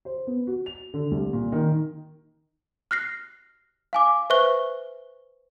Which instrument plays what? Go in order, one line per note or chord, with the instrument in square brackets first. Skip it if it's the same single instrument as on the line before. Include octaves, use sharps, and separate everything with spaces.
[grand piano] C5
B3
F#4
F7
D3
C2
A#2
D#3
[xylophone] F6 F#6 A#6 C7
F5 G#5 D6
B4 C5 E5 C#6 F#6 G7